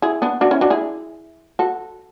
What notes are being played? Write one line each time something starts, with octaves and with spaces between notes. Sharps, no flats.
E4 G#4
B3 D4
D4 F#4
C#4 E4
D4 F#4
E4 G#4
F#4 A4